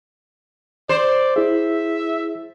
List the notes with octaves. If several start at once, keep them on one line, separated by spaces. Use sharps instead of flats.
C5 D5
E4 G#4 E5